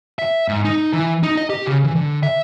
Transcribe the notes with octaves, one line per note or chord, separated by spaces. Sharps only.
E5
G#2
D#4
E3
D#4
D#5
G4
C#3
E3
D3
E5